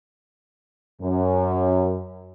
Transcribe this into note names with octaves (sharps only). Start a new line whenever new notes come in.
F#2